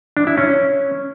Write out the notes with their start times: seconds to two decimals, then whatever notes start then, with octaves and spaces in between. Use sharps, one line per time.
0.17 D4
0.27 E4
0.37 C#4